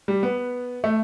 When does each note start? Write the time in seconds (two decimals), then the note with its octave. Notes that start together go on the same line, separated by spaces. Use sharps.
0.08 G3
0.23 B3
0.84 A3